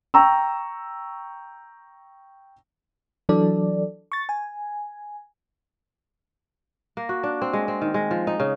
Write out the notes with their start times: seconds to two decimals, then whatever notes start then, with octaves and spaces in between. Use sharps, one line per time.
0.14 G5 A#5 C#6 E6
3.29 E3 F#3 D4 A4 D5
4.12 C#6 A6
4.29 G#5
6.97 A#3
7.09 F#4
7.23 D4
7.42 C4
7.53 G#3
7.68 C4
7.82 D#3
7.94 G#3
8.11 F3
8.27 D#4
8.40 C#3